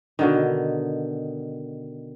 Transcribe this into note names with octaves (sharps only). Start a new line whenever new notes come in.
B2 D3 D#3